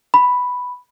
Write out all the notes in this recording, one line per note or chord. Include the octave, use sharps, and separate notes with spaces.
B5